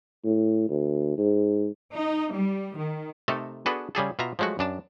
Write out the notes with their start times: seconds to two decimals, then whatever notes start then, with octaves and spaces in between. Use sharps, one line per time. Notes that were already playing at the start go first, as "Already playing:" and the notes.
0.24 A2
0.69 D2
1.18 G#2
1.94 D#4
2.32 G3
2.77 D#3
3.28 C3 A3 D#4 A4 A#4
3.66 B3 D4 F#4 G#4 A4 B4
3.95 C#3 G3 G#4 A4
4.19 B2 F4 E5 A#5
4.39 F3 F#3 G#3 A3 F#4
4.59 F#2 D4 A5